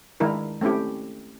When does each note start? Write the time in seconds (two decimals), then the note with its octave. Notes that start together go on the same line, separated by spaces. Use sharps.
0.20 D#3 G#3 D4 E4 A#4
0.61 A3 C4 C#4 E4 G4